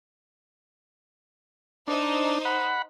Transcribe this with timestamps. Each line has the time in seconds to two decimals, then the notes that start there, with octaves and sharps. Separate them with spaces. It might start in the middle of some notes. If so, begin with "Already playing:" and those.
1.88 D4 D#4 C5
2.45 F#5 B5